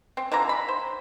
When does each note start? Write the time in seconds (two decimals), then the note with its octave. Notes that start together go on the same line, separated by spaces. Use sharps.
0.17 C4
0.32 D3 E3 F3 A#5
0.49 B5
0.68 C5